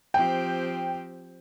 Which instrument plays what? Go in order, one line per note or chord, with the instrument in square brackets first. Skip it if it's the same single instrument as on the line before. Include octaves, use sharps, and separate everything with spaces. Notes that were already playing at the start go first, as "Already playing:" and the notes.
[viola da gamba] F3 C4 G4 [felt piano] G5